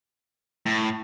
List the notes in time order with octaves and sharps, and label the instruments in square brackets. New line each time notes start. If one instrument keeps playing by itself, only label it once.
[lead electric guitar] A2